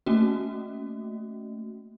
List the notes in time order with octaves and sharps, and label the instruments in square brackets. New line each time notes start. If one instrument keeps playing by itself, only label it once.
[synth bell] A3 A#3 C#4 F#4